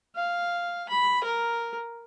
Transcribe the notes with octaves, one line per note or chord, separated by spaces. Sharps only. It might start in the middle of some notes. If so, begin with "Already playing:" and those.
F5
B5
A#4